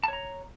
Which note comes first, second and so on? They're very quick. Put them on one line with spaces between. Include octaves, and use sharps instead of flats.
A5 C#5 A#5